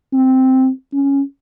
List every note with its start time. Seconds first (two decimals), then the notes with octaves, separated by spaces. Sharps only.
0.13 C4
0.93 C#4